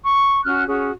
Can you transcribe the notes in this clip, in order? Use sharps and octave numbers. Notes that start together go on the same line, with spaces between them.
C#6
C#4 F#4 F6 F#6
C#4 F#4 G#4